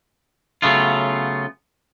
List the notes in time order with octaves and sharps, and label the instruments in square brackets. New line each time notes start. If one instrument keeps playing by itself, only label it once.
[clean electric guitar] C#3 F#3 A3 B3 F4